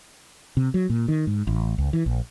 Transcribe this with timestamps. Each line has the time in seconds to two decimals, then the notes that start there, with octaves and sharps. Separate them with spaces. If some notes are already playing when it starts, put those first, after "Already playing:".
0.57 C3
0.74 F#3
0.90 A#2
1.08 D#3
1.27 G#2
1.47 A1
1.78 C#2
1.93 E3
2.06 A#1